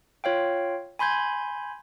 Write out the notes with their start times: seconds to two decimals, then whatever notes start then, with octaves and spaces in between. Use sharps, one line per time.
0.24 F4 C#5 F5 G5
0.99 G#5 B5 C6 G6 G#6